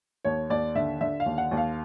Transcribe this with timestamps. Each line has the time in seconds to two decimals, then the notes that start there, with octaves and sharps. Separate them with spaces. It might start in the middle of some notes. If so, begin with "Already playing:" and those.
0.25 D#2 C#5
0.50 D#2 D5
0.75 D3 E5
1.01 D3 E5
1.20 F5
1.26 D#2
1.38 F#5
1.51 D#2
1.57 F5